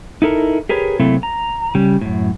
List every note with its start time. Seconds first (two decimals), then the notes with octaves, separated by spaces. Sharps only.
0.22 D#4 E4 A4 A#4
0.69 G4 G#4 A#4 B4 C#5
1.00 C3 F#3 A3 A#3 C4 E4
1.23 A#5
1.75 C#3 G3
2.01 F#2 A2